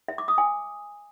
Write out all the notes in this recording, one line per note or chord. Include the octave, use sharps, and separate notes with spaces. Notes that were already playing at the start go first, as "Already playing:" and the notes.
E5
D6
D#6
G#5